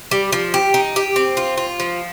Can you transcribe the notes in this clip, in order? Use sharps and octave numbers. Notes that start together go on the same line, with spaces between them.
G3
F3
G4
D#4
G4
C4
F4
F4
F3